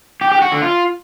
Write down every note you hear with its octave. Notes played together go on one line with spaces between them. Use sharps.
G4
G4
F#4
D3
F4